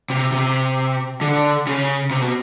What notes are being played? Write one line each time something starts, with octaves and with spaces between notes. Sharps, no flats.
C3
C3
D3
C#3
C3
B2